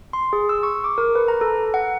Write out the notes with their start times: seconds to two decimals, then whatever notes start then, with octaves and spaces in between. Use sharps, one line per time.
0.13 C6
0.33 G#4
0.49 E6
0.63 C#6
0.84 D6
0.98 A#4
1.15 B4
1.28 A#5
1.41 A4
1.74 F#5